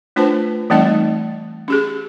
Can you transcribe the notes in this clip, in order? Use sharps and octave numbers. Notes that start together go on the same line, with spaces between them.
A3 D4 F4 B4 C5 A5
E3 G3 A3 C4 D#4 D#5
C#4 G4 G#4